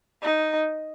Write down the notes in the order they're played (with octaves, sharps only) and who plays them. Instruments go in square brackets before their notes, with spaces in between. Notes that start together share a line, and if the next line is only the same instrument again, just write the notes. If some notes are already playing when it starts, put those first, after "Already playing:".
[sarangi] D#4